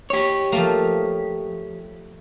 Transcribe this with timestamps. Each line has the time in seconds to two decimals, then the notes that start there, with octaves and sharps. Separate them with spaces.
0.10 G4 C#5
0.52 F3 A3 A#3